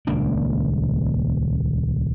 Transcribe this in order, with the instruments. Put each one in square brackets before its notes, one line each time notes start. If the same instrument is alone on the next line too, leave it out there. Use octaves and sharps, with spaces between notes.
[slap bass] D#1 C#2 A#3 D4